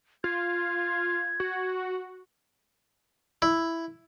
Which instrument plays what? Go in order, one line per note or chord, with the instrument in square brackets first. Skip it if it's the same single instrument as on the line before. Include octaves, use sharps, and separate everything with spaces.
[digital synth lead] F4 [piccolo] G#6
[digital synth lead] F#4
[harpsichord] E4